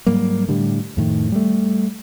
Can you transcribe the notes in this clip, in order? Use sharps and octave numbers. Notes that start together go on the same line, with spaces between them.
G#2 F#3 G3 A#3
A2 D3 G3
F2 A2 D#3
G3 A3